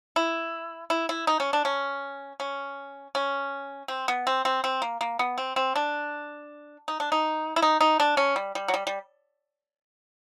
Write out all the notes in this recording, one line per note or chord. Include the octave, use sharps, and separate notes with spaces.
E4
E4
E4
D#4
C#4
D4
C#4
C#4
C#4
C4
B3
C4
C4
C4
A#3
A#3
B3
C4
C4
D4
D#4
D4
D#4
E4
D#4
D#4
D4
C#4
G3
G3
F#3
G3
G3